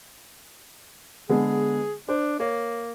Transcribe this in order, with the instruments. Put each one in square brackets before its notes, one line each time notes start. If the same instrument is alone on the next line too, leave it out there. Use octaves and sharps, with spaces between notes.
[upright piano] D3 G#3 B3 [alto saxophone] G#4
[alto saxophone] D4 [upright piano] C5
[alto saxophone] A#3 [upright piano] C#5